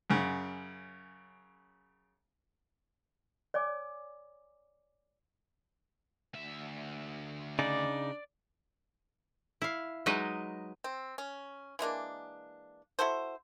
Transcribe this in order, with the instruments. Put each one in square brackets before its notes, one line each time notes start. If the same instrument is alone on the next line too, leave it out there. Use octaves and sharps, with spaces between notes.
[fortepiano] F#2 C#3
[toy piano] C#5 D5 G#5 D6
[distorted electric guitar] D2 E5
[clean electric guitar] C#3 D#4 [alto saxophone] D4 [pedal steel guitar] D5
[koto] E4 F5
F#3 G#3 D#4 B4 D#5
[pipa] C4
C#4
E3 G#3 A#3 D4
E4 F#4 A4 C5